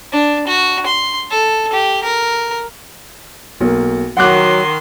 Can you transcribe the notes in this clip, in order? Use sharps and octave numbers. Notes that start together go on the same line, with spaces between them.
D4
F#4
C6
A4
G4
A#4
B1 A#3
D#3 F#3 F#5 C6 D6 F#6